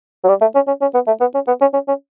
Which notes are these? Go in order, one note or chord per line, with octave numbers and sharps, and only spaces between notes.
F#3
G3
A3
C#4
C#4
C#4
B3
A3
B3
C#4
B3
C#4
C#4
C#4